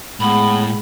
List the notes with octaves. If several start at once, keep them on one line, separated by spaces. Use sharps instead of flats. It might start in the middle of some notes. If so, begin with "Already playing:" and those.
A2 G#3 B3 B5